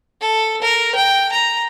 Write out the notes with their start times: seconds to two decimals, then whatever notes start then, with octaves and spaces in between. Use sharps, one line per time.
0.21 A4
0.62 A#4
0.95 G5
1.32 A#5